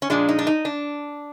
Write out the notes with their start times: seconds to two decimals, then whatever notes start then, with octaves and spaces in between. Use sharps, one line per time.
0.02 C#4
0.10 A#2 F3 G#3 D4
0.29 D#4
0.39 D4
0.47 D#4
0.65 D4